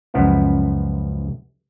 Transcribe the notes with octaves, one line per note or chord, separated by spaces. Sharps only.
C#2 F#2 F3 B3 E4